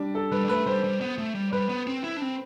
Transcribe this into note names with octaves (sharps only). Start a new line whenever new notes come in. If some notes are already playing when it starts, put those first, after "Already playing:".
Already playing: G3 D4
A4
G3 B4
G3
A3 B4
G3 C5
G3
B3
A3
G3
G3 B4
B3
C4
E4
D4
C4